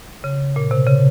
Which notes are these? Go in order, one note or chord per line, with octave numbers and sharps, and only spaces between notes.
C#3
A#2
C3
C#3